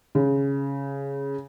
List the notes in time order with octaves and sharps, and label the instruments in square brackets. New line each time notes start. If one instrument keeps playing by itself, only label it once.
[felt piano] C#3